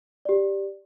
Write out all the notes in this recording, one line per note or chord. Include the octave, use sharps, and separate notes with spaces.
G4 D5